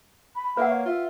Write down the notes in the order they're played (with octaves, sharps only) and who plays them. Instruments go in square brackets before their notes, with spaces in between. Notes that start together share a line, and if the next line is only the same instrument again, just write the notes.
[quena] B5
[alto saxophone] A#3 [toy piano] B4 F#5 [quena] E5
[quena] C#5
[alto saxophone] F4 [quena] E5